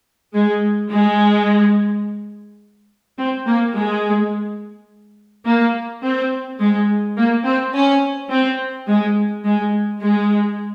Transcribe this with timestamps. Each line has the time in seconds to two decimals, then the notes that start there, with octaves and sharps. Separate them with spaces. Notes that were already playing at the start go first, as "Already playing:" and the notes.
0.34 G#3
0.91 G#3
3.18 C4
3.47 A#3
3.76 G#3
5.46 A#3
6.04 C4
6.60 G#3
7.18 A#3
7.45 C4
7.74 C#4
8.31 C4
8.88 G#3
9.45 G#3
10.01 G#3